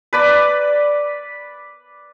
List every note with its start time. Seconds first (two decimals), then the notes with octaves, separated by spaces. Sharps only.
0.13 B4 D5 B5